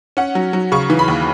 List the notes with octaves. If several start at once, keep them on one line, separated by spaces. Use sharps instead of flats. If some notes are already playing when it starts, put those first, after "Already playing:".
C#4 F#5
F#3
F#3
C#3 C#6
E3
B5
D#2